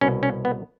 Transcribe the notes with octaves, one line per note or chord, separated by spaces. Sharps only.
C2 B2 C#4
C#4
B3